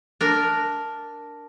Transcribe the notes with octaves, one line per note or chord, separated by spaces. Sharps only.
D4 A#4